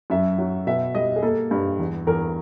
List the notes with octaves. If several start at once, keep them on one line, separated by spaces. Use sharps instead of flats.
F#2 E5
F#3
B2 E5
G3 D#5
G#4
A#3 A4
G2
E2
E2 A#4